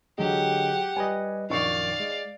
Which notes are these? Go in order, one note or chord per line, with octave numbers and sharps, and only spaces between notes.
D3 F#3 G#3 G4 D#5 F#5
G3 B4 D#5 G#5
A#1 F#2 D#3 D#4 D5 F5 C#6
G#3